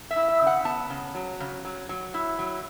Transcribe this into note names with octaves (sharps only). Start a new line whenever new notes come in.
E5
E4
E5
C#3
F#5
B3 A5
C#3
F#3
C#3
F#3
F#3
E4
F#3